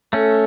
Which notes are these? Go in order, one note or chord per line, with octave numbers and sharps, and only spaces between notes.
A3 C#4 A4